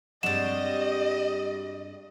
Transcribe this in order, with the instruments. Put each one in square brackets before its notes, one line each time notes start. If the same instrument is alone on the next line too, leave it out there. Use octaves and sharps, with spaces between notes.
[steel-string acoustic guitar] G2 G#3 C4 [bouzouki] G3 F#4 [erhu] D#5 [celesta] E7